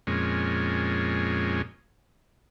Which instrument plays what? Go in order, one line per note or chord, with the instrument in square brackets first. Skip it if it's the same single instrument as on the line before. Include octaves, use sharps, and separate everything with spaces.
[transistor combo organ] F2 A#2 G#3 C#4